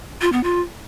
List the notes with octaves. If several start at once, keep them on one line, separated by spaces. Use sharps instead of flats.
F4
B3
F4